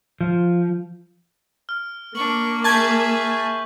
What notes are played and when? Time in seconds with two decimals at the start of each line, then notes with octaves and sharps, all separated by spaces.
0.21 F3
1.69 F6
2.15 A#3 D4 C#6 F#7
2.64 G#4 E5 A5 C#6 G6 G#6 B6